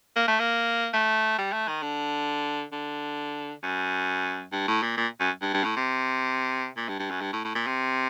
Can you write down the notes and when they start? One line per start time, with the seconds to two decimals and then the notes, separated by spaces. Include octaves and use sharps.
0.16 A#3
0.28 A3
0.40 A#3
0.93 A3
1.38 G3
1.52 A3
1.68 D#3
1.83 D3
2.72 D3
3.63 F#2
4.52 G2
4.68 A2
4.83 A#2
4.97 A#2
5.20 F#2
5.42 G2
5.54 G2
5.64 A2
5.76 C3
6.77 A#2
6.89 G2
6.99 G2
7.11 F#2
7.21 G2
7.33 A2
7.45 A2
7.55 A#2
7.67 C3